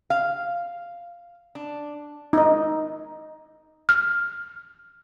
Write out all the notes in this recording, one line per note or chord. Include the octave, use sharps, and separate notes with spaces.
F5
D4
D#4 D#5
F6